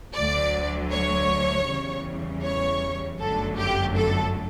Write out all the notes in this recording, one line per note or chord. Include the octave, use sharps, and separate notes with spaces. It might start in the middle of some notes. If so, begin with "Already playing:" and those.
D2 D3 F#3 D5
C#5
E2 C#3 E3 G3
C#5
G1 F#2 D3 F#3 A3 A4
G4
A4